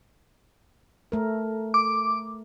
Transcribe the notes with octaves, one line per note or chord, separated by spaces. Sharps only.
A3 A#4
D6